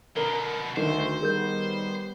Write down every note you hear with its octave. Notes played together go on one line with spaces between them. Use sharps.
B2 D3 A#4 G7
D2 D#3 C5
G3 B3 G#4 A#4 G6